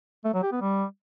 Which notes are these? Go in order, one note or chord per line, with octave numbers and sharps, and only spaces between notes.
A3
F#3
G4
B3
G3